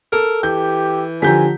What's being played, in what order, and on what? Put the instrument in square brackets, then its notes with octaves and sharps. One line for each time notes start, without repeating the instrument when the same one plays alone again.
[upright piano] A4 [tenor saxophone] A#4
[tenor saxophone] E3 [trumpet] G4 [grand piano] G6
[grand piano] D3 F3 G4 [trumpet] G#5 [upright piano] A#5 G6 B6